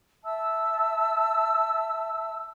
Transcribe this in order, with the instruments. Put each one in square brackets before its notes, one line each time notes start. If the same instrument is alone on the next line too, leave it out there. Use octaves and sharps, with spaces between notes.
[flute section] E5 A5 E6